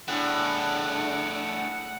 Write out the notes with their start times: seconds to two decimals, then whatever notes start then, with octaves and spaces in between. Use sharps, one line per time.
0.08 A2 A3 D4 G#4 F#5